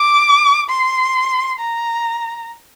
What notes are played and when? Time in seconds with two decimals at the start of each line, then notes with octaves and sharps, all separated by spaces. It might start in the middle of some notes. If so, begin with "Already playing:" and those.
Already playing: D6
0.70 C6
1.61 A#5